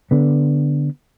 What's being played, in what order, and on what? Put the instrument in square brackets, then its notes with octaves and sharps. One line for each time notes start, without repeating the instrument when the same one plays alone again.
[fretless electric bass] D3 B3